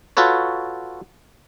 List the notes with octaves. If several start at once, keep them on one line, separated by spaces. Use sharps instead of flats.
F4 F#4 A4 B4 C#5